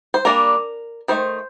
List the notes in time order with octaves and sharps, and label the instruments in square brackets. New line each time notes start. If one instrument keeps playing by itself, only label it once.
[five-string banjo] C5
G3 A#3 D4 A#4
D#3 A3 C5